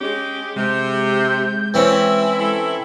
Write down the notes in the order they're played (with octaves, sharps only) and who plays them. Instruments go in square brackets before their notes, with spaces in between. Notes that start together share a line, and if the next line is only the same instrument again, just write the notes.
[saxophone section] G#3 G4 [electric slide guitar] C#4
[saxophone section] C3 [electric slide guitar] G#3 [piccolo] G6
[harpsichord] E3 C4 C#4 [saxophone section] E4 [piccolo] E6
[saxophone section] E4 A4